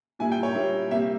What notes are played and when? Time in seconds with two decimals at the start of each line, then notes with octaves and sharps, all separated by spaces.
0.19 A#2 G3 A#3 E4 G#5
0.32 G5
0.43 C#5
0.55 A#2 G3 A#3 E4
0.91 C3 G3 A#3 E5